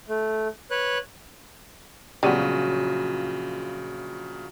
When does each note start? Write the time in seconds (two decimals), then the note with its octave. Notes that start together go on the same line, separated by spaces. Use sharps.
0.09 A3
0.71 B4 C#5 F#6
2.23 A#1 C#3 F#3 G3 B3 F4 G5 D#7